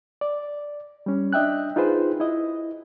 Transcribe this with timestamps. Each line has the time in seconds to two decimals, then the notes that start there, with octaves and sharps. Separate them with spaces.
0.21 D5
1.06 G3 C#4
1.33 D4 D#5 E5 G5 F#6
1.76 D#4 F4 G#4 B4 C5
2.20 E4 D#5